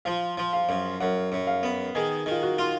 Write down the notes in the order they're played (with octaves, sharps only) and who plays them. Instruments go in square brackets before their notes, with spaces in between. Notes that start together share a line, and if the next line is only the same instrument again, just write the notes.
[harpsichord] F3 [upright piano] F5
[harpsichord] F3
[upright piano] F5
[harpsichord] F#2
[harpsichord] F#2 [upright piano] F#5
[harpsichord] F#2
[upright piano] F5
[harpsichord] B3
[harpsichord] D#3 [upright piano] G#4
[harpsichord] D#3
[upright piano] F4
F#4
[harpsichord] F4